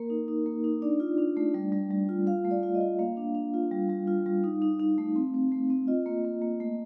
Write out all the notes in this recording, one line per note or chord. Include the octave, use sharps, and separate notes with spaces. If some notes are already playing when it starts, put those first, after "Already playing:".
Already playing: A#3 A#4
D#4
D#4
A#3
D#4
D4 D5
F4
D4
A3
G3
G3
G3
F4
F4 F5
A3
D5
F4
D#5
F4
A#3 F5
D4
D4
F4
G3
G3
F4
G3
D#4
D#4
D#4
A3
C4
C4
A3
C4
F4 D#5
A#3
A#3
A#3
A3